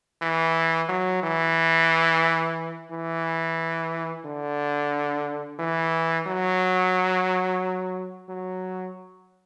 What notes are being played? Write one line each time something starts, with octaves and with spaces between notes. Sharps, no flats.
E3
F#3
E3
E3
D3
E3
F#3
F#3